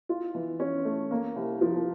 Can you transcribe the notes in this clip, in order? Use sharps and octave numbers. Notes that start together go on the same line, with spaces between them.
F4
E3
C#4
A3
A#3
C2
F3